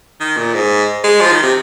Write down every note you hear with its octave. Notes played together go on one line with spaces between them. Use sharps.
D#3
A#2
G#2
G#3
F3
D#3
C3